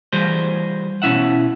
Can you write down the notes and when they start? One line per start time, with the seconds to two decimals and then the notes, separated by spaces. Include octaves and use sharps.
0.12 E3 G3 F#4 G#4 C5
1.02 B2 C#4 E4 E5 F#5